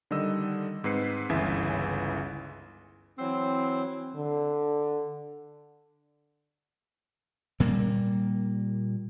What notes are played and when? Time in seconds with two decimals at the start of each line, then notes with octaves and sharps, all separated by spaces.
0.11 D3 D#3 G3 D#5 E6
0.84 G#2 C4 B4 C7 C#7
1.29 G1 C#2 C#3 E3 E5 G#5
3.19 E3 F#3 C4
4.16 D3
7.60 A#2 G3 A#3